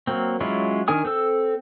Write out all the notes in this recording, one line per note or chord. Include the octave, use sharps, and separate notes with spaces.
F#3 A#3 C4
F#3 G#3 C#4 E4 F4
D#3 D4 A#4 G#5 D#6
C4 A4 E6